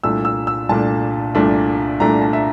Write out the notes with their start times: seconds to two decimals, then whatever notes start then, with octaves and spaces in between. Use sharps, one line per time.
0.04 C2 A#2 A3 D4 E6
0.25 E6
0.47 E6
0.69 C2 A#2 A3 D4 A5
1.35 C2 A#2 A3 D4
2.00 C2 A#2 A3 D4 A#5
2.22 A5
2.33 E5